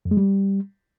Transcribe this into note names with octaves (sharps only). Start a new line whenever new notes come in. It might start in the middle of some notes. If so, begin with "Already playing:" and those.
F2
G#3
G3